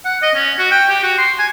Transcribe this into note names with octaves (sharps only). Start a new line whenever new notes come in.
F#5
D#5
C#4
F#4
G5
G4
F#4
C6
G#5